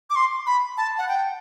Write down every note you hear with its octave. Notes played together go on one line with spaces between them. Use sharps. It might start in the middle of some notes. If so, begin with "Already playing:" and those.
D6
C6
B5
A5
F#5
G5